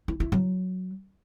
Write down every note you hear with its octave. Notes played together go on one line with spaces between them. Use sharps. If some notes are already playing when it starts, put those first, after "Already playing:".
E4
E4
F#3